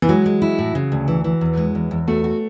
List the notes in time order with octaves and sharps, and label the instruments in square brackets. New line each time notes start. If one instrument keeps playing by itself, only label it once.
[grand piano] E3
[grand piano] F#3 [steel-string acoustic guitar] G#3
[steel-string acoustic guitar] G#3
E4
A2
C#3
D2
E3
E3
E2
G#3
E2
E2
[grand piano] A3 [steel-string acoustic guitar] F#4
[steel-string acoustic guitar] F#4